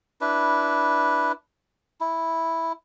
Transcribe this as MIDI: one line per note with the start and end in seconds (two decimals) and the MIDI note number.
0.21 1.32 62
0.21 1.32 64
0.21 1.32 71
2.01 2.72 64